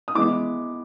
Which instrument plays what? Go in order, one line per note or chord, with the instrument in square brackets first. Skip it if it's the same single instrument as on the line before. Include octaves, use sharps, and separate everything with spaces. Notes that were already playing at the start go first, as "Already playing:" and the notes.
[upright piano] D#6
[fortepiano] E3 G#3 B3 [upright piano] D6